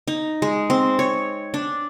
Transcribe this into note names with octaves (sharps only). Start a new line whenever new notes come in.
D#4
G#3
C4
C#5
D4